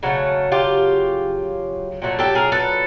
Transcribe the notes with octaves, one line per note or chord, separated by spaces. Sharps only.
C#3 F#3 A3
F4 G4
A#2 F#3 A3
G4 A4
G#4 A#4
A4 B4